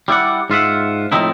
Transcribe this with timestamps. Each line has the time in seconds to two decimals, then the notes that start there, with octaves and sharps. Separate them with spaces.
0.08 G3 E4 D5 F#5
0.50 G#2 F4 E5 F#5
1.12 A2 F3 C4 D#4 E4